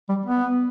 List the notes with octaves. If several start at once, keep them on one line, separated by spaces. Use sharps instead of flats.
G3
B3